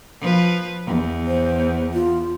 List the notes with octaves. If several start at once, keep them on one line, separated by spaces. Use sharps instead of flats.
F3 B4
E2
C5
F4